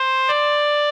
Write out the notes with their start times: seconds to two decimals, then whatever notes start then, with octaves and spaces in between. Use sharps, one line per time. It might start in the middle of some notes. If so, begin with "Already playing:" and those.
Already playing: C5
0.28 D5